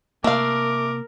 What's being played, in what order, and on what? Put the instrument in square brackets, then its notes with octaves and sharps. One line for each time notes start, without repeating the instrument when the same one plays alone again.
[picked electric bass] C3 A#3 [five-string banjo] A3 F5 [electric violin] A#4 [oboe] D6